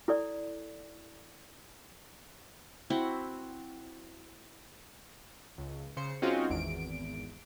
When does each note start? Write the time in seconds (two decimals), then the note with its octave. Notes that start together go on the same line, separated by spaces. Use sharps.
0.08 E4 A4 D5
2.90 C4 E4 F#4 F#5
5.58 C#2
5.97 C#3 C5 C#7
6.22 G#3 C4 C#4 D#4 F4 F#4
6.49 G#1 E2 D7